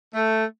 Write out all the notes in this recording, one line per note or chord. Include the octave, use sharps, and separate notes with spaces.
A3